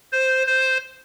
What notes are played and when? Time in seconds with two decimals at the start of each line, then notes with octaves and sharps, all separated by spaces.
0.12 C5
0.47 C5